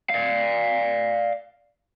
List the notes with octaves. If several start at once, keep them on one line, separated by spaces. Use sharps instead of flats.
D5 F5